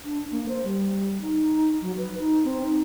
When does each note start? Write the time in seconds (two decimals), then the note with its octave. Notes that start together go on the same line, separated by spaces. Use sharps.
0.05 D4
0.31 A#3
0.49 C5
0.64 G3
1.21 D#4
1.82 F#3
1.97 B4
2.20 D#4
2.44 C4
2.62 D#4